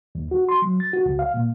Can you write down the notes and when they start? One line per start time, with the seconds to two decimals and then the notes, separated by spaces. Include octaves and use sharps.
0.15 D#2
0.31 F#4
0.49 C6
0.62 F#3
0.80 A6
0.93 F#4
1.06 C#2
1.19 F5
1.34 A#2